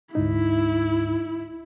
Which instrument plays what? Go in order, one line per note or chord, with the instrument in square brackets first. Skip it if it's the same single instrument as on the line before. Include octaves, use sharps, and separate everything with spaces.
[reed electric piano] D2 G#2 D#4 [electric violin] E4